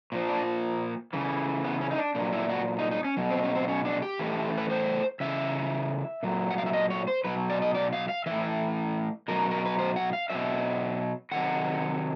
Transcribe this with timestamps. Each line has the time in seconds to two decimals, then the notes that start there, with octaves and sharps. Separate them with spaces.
0.12 A#2 F3
0.29 D4
1.13 C#3 E3
1.64 B3
1.81 C#4
1.91 D#4
1.98 D4
2.15 A#2 F#3 D4
2.33 E4
2.49 F#4
2.79 D#4
2.91 D#4
3.04 C#4
3.17 B2 F#3
3.30 C4
3.43 C#4
3.55 C4
3.68 C#4
3.85 D4
4.02 G4
4.19 A2 E3
4.58 B4
4.70 C5
5.20 C#3 E3 E5
6.23 A#2 F#3
6.50 F#5
6.58 F5
6.66 E5
6.73 D#5
6.90 C#5
7.08 C5
7.24 B2 F#3 B4
7.50 D5
7.62 D#5
7.75 D5
7.93 F5
8.09 F5
8.26 A2 E3 E5
9.28 B2 F#3 A#4
9.51 A#4
9.65 B4
9.79 C5
9.96 F#5
10.13 F5
10.29 B2 F#3 E5
11.31 C3 D#3 F#3 F#5